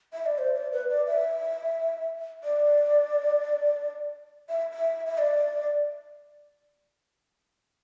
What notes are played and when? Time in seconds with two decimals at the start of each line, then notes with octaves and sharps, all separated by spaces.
0.13 E5
0.26 D5
0.38 C5
0.55 D5
0.72 B4
0.90 D5
1.07 E5
2.44 D5
4.49 E5
4.73 E5
5.06 E5
5.18 D5